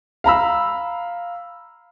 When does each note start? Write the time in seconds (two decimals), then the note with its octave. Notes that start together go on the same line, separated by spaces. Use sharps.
0.24 F5 A#5 B5 E6